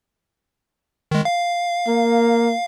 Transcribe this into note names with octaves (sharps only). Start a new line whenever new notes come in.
D#3 G#3
F5
A#3